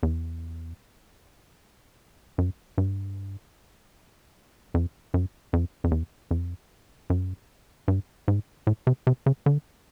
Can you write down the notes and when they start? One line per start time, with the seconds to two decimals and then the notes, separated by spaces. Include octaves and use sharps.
0.03 E2
2.38 F#2
2.78 G2
4.74 F2
5.14 F#2
5.53 F2
5.84 F2
5.91 E2
6.31 F2
7.10 F#2
7.88 G2
8.28 G#2
8.67 A2
8.87 C3
9.07 C3
9.26 C#3
9.46 D3